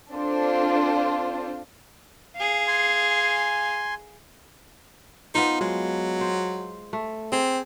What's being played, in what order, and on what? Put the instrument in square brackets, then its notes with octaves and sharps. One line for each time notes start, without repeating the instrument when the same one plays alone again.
[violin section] C4 D4 F4 A4 C5
[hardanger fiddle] G#4 F5
[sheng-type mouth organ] G#5 C6
[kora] B3 F4 C5 [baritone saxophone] D#4
[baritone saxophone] F#3 [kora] G#3
[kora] C5
A3
[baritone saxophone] C4 [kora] G#4 G5